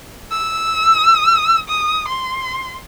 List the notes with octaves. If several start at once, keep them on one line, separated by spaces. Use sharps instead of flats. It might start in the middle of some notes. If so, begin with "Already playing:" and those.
E6
D#6
C6